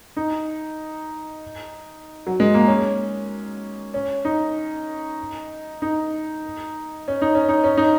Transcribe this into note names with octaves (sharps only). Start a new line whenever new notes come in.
D#4
F#3
G#3
A#3
C#4
C#4
D#4
D#4
C#4
D#4
C#4
D#4
C#4
D#4